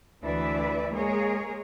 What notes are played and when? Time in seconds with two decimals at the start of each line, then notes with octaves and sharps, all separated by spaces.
0.23 D2 E3 E4 B4 D5 E5
0.93 G#3 A#3 G#4 A#4 C#5